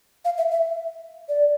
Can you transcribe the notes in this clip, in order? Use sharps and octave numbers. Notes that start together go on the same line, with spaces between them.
F5
E5
E5
D5